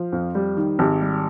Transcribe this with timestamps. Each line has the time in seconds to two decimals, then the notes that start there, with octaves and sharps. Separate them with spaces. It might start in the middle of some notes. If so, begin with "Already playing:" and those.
Already playing: F3
0.13 F2
0.35 G3
0.57 D#3
0.79 G#1 G4
1.01 G3